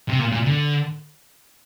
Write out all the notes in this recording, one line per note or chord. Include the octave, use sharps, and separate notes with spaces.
C3
A#2
A#2
D3